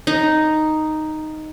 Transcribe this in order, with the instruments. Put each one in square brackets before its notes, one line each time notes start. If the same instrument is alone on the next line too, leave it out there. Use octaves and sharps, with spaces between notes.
[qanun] D#4